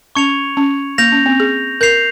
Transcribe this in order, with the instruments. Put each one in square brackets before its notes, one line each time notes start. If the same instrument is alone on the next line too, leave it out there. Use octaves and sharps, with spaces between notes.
[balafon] C#4 [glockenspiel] C#6 G#6 C#7 F7
[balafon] C#4
[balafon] A#3 [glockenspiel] G6 A#6 F7
[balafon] C#4
C4
G#4
[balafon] A#4 [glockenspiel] G6 C7 F7